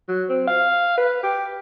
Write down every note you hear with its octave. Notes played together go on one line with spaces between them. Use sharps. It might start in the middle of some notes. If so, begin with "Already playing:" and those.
F#3
C4
F5
B4
G4